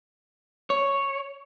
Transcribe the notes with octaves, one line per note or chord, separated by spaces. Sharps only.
C#5